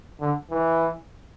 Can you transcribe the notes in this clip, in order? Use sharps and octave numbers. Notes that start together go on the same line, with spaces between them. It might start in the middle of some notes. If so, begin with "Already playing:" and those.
D3
E3